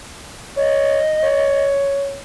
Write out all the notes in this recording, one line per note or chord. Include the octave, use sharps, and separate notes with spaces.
C#5 D#5
C#5